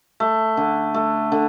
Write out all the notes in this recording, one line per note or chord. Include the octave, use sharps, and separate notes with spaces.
A3
D3
A3
D3